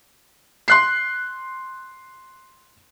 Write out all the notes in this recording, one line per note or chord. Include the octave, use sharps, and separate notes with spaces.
C6 F#6 C7